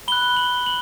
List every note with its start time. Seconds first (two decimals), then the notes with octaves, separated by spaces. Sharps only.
0.08 B5 F#6 G7
0.37 F#7
0.66 F#7